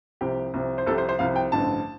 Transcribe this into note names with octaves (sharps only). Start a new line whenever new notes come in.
C2 C3 F3 G4
C2 C3 F3
C5
C2 C3 F3 A4
C5
C5
C2 C3 F3 F5
G5
A1 G2 D3 F3 A5